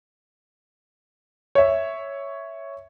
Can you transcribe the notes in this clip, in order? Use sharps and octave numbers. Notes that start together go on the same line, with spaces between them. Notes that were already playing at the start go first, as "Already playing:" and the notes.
C#5 E5